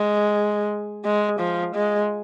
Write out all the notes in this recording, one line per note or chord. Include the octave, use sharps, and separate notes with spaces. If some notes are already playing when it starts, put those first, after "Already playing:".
Already playing: G#3
G#3
F3
G#3